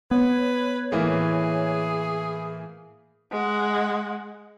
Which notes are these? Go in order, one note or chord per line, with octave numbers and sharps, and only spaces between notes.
B3 B4 C#5
A2 E3 A#3 G#4
G#3 F#5